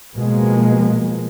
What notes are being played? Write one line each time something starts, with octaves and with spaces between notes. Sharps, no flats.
B2 F3 G#3 A#3